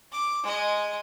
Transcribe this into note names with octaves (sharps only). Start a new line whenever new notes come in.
D6
G#3 D#5